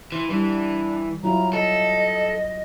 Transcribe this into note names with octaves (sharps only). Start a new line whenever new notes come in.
E3 C6
E3 G3 D4
F#3 E4 F4 A#5
A4 D#5